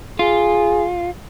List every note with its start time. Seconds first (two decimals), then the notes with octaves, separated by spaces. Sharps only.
0.19 F4 G#4